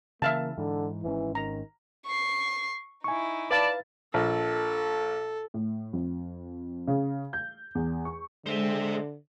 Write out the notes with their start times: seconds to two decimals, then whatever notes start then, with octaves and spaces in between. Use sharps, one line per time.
0.22 C#3 E3 A#3 E5 F5 A5
0.57 G#2 D3 E3
1.03 G#1 G#2 E3 C#4
1.35 D#3 A#5
2.06 C#6 C7
3.04 D#4 E4 G#5 C#6
3.51 B4 D5 F5 A5 B5 A6
4.14 A#1 A4
5.54 A2
5.93 F2
6.87 C#3
7.33 G6
7.75 E2
8.05 C#6
8.46 D3 G#3 C5 E5